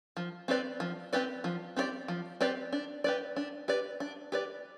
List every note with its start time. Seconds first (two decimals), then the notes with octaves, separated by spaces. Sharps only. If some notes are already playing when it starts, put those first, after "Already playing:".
0.17 F3
0.48 C4 G4 B4 D5
0.80 F3
1.13 C4 G4 B4 D5
1.44 F3
1.76 C4 G4 B4 D5
2.08 F3
2.41 C4 G4 B4 D5
2.73 D4
3.04 G4 B4 D5
3.36 D4
3.68 G4 B4 D5
4.00 D4
4.32 G4 B4 D5